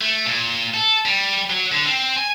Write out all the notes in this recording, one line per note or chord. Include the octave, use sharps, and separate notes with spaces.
A3
A#2
A4
G3
F#3
D3
C4
G#5